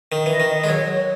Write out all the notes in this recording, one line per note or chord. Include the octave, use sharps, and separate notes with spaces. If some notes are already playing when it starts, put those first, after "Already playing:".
D#3
E3
D#5
D#3
D#5
G#3
F#3 C#5